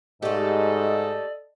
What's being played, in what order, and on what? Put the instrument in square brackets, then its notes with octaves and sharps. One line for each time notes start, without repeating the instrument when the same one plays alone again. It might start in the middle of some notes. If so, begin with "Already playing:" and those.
[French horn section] G#2 [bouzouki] A3 G4 [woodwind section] A4 D#5 [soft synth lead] D5